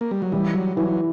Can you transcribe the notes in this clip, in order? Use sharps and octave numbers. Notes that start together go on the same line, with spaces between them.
A#3
G3
F#3
E3 G3
F#3
E3 F#3